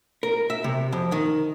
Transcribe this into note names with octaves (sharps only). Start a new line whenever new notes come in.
A#4
E5
C3
F2
D#3